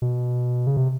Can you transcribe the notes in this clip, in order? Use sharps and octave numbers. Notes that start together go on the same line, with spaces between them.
B2
C#3
C3